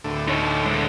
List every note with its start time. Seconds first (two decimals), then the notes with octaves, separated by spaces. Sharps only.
0.04 D2 A2
0.28 D#4 C#5
0.66 G#3 D4